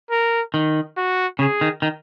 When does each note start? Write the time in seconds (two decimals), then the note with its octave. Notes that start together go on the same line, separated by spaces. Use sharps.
0.11 A#4
0.54 D#3
0.97 F#4
1.39 C#3 G#4
1.61 D#3
1.82 D#3